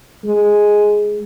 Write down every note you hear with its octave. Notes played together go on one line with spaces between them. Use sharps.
G#3